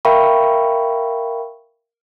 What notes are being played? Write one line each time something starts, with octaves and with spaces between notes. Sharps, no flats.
A#4 E5 F5 G5 B5 C#6